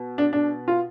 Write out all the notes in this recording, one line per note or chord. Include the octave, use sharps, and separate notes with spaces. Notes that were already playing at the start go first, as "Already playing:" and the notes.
Already playing: B2
D4
D4
F4